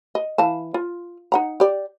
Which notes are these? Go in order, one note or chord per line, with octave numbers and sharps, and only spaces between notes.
D#5
E3 F5 A5
F4
D#4 F#5 A#5
G4 D5